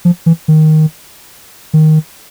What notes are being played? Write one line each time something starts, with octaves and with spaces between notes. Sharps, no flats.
F3
E3
D#3
D#3